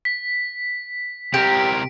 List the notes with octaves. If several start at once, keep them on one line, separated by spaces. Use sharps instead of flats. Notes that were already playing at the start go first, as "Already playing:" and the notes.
B6
C3 G4 A#4 D7